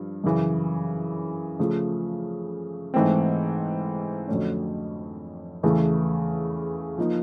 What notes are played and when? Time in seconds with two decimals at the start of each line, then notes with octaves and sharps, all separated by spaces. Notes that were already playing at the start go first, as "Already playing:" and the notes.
Already playing: G2 F3
0.24 F#2 C#3 E3
1.59 C#3 F3 A3
2.94 G#2 E3 A3 C4
4.28 F2 D3 F#3 A3 C#4
5.63 E2 C#3 E3 A3
6.98 F3 A#3 D#4